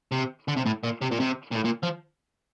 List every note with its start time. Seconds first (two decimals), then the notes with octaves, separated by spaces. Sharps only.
0.12 C3
0.48 D3
0.57 C3
0.66 A2
0.84 A#2
1.02 C3
1.12 A#2
1.20 C3
1.52 A#2
1.56 A2
1.65 A#2
1.83 F3